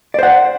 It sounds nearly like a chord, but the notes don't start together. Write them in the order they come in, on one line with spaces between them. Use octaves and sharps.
D5 C5 F#5